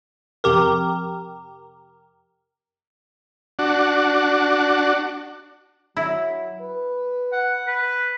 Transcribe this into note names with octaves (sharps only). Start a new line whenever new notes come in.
F2 C3 G4 A#4
D4 F#4
F#3 E4
B4
F#5
B4